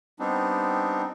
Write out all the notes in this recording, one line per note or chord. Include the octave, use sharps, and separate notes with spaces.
G3 B3 C4 D4 D#4